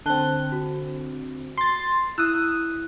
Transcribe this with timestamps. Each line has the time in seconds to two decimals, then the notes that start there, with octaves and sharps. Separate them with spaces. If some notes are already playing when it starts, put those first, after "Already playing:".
0.06 D3 C4 A5 F#6 G7
0.52 F#4
1.58 C6 A6
2.18 E4 D#6 E6 F#6